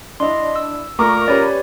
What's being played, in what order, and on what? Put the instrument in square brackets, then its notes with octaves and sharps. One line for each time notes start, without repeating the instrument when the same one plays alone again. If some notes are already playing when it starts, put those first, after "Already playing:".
[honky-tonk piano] D4 E4 [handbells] D#5 C6
[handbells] E6
[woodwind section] A#2 A#4 A#5 [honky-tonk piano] A3 C#6 D6
[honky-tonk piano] C#4 B4 [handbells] G4 C#5 D5